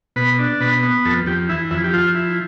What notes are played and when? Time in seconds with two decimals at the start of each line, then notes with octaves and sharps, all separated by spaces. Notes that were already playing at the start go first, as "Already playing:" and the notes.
0.16 B2 B4
0.39 D4
0.60 B2 B4
0.83 B3
1.05 F2 A4
1.26 F2 G4
1.49 E3 E4
1.71 F2 E4
1.84 G4
1.93 F3 F4
2.15 E4